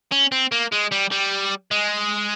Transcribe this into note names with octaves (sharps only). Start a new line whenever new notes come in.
C#4
C4
A#3
G#3
G3
G3
G#3